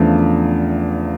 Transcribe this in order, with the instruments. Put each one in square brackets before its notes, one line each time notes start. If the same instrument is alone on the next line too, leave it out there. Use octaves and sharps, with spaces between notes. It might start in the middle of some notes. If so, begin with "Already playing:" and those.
Already playing: [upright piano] E2 C#3 F3 A3 D4